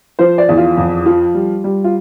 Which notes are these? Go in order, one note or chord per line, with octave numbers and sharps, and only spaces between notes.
F3 C5
D5
E2
F4
F2
F3
G3
G3
F4